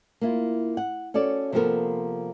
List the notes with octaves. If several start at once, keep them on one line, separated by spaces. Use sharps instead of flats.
A#3 E4 F4
F#5
C#4 F#4 A4 D5
C3 F3 A#3 B3 A4 A#4